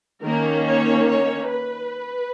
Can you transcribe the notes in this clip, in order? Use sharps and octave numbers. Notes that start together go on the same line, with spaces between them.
D#3 A#3 C#4 A#4
C#5
C#5
B4